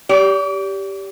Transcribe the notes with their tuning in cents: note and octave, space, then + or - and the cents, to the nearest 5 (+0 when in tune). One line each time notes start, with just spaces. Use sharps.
G4 +0 D5 -40